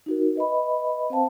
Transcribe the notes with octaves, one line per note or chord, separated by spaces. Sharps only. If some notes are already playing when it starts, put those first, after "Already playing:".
D#4 F#4 A#4
B4 D#5 E5 B5
C4 C5 F5 G5 A5